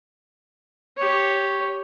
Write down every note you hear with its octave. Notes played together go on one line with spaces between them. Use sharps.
G4 C#5